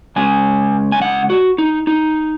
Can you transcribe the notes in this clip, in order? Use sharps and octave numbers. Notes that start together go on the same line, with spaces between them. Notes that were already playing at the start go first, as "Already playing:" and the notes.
C#3 G#3 C#4 G#5
G#5
F#5
F#4
D#4
D#4